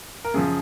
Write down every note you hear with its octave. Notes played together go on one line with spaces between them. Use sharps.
A#4
F#2 C#3 F3 G#4